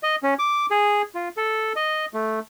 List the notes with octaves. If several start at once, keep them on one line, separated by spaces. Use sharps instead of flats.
D#5
C#4
D6
G#4
F4
A4
D#5
A3